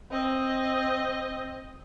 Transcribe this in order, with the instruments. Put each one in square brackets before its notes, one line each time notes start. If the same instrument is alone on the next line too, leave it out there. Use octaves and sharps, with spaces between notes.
[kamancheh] C4 D#5